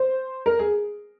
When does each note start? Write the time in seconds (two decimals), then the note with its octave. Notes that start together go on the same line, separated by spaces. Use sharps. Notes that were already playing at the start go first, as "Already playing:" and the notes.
Already playing: C5
0.46 A#4
0.59 G#4